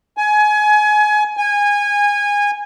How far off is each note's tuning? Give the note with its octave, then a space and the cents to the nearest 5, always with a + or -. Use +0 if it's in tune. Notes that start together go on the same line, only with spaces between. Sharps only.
G#5 +25
G#5 -20